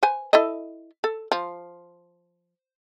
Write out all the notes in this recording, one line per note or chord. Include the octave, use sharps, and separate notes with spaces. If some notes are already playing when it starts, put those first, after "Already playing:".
B4 C5 G#5
E4 A4 D#5
A4
F3